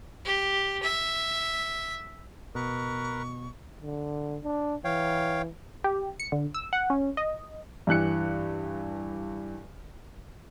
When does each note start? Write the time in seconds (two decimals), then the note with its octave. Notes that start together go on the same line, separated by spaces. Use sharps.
0.25 G4
0.83 E5
2.55 B2 A#4 B4 C#6
3.82 D3
4.44 D4
4.84 E3 C#5 F5 G5
5.84 G4
6.20 C#7
6.32 D3
6.54 E6
6.73 F#5
6.90 C#4
7.17 D#5
7.87 G2 E3 F#6 C#7